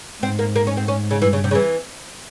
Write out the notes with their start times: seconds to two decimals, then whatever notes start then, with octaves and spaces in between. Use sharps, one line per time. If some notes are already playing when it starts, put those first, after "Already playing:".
0.22 G#2 C4
0.39 A#3
0.56 A#3
0.67 C#4
0.77 C4
0.88 C#4
1.11 C#3
1.22 G2 E3
1.33 C#3
1.44 C3
1.51 C#3
1.55 E3